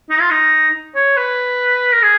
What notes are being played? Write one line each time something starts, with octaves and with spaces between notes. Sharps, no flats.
D#4
F4
D#4
C#5
B4
A#4
G#4